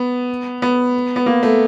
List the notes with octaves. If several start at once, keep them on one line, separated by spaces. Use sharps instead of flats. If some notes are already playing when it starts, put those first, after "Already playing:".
Already playing: B3
B3
B3
A#3
A3